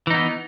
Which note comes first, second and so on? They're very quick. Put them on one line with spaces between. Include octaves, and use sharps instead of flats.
E3 D#4 B3